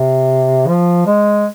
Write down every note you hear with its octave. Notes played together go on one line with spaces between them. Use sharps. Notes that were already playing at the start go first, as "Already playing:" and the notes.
Already playing: C3
F3
G#3